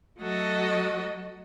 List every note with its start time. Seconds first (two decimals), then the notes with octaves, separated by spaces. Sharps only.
0.19 F#3 A3 F#4 A4 D#5